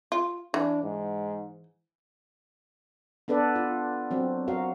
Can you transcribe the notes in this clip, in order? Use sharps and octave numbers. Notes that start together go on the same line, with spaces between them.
F4
E3 D4
G#2
B3 D4 A4 B4 D5
F4
F#3 C4
F#3 F#4 A#4 F5